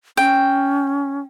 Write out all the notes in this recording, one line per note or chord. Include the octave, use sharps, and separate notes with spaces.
C#4 G5